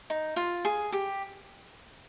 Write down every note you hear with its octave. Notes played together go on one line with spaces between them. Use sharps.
D#4
F4
G#4
G4